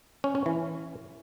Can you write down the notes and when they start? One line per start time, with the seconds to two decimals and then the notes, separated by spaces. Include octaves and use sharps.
0.24 C#4
0.35 C#4
0.46 E3